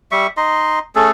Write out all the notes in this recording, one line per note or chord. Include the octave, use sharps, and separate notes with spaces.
G3 E5 C#6
D#4 D#5 C6
A3 C#4 G#4 A4